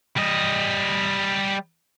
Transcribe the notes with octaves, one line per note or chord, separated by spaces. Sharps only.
G3 D#5